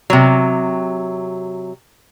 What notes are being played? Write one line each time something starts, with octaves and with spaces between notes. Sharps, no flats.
C3 F#3